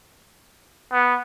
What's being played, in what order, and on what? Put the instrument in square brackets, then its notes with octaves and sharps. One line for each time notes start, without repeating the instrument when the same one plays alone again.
[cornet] B3